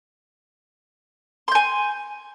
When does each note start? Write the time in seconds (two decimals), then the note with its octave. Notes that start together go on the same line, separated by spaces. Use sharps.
1.48 C6
1.52 G6
1.55 G#5